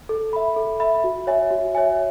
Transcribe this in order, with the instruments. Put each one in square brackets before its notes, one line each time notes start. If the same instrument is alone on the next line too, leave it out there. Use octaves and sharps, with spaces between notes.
[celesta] A4
E5 B5
A4
E5 B5
F#4
C#5 E5 G#5
F#4
C#5 E5 G#5